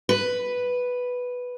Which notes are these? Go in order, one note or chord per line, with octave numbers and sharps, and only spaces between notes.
B4